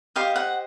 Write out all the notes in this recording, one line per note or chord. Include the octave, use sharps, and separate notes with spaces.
G4 C5 D#5 F5
F#5